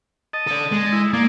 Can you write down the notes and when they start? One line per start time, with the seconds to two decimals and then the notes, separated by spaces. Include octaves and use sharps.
0.33 D#5 A5
0.47 A4 D5
0.72 G#3
0.92 E4
1.13 A#3 D5 G#5